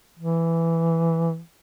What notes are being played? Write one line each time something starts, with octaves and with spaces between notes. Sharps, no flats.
E3